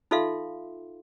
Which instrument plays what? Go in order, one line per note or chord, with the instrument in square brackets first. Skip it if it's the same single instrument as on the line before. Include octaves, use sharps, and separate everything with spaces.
[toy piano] D#4 F4 A4 E5 F5 C6